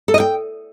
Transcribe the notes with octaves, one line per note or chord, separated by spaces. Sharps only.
A4
D#5
G5